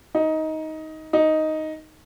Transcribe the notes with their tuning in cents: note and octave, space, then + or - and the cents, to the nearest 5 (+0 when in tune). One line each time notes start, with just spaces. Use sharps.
D#4 +15
D#4 +5